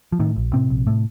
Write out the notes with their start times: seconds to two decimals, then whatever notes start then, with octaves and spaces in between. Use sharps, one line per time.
0.12 F3
0.19 A2 D#3
0.36 A#1
0.53 A2 C3 C4
0.70 A#1
0.87 A2